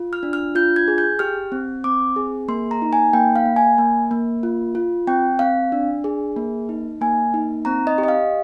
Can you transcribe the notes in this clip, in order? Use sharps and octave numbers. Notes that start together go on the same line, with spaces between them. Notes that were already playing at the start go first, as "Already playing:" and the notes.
Already playing: F4
F6
D4
F6
F4 G6
G#6
G#4
G6
G4 F6
C4
C4 D6
G#4
A#3 C6
A#5
D#4
G#5
A#3 G5
F5
A#3
G#5
A#3
A#3
F4
F4
C4 G5
C4 F5
D4
G#4
A#3
D#4
A#3 G#5
D#4
C4 A#5
D#5
G4
D#5
F5